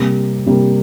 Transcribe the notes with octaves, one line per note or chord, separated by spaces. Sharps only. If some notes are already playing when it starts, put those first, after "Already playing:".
Already playing: C3 G3 A#3
C3 G3 A#3